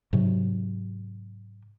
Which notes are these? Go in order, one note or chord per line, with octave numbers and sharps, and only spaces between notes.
G#2 C3 F#3